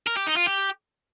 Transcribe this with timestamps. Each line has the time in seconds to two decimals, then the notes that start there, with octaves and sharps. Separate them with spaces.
0.07 A#4
0.17 G4
0.27 D#4
0.37 F4
0.47 G4